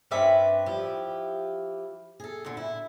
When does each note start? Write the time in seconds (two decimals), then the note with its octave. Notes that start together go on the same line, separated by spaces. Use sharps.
0.11 G2 C4 C#4 B4 D5 E5
0.66 F3 E4 G4
2.20 G#4 A4
2.45 A#2 D3
2.57 E4